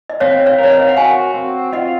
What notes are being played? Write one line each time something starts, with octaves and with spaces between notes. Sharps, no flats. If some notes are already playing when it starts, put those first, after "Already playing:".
D#5
C4 C#5 F5
C#5 F5
A#4 C#5
D#5
F5
F#5
F#4 F5 G#5
C4
F4 D#5 F#5